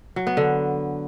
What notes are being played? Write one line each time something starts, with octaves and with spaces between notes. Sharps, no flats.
F#3
B3
D3